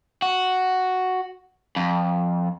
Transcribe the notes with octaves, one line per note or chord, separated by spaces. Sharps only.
F#4
F2